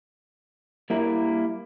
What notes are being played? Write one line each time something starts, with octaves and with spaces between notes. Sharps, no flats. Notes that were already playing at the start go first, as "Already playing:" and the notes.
G3 A#3 E4 A#4